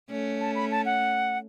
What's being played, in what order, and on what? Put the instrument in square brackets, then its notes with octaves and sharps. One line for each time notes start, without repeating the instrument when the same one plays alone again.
[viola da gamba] A3 C#4
[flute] A5
B5
A5
F#5